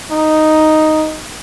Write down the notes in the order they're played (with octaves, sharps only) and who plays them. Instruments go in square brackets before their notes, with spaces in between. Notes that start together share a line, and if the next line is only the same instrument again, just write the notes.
[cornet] D#4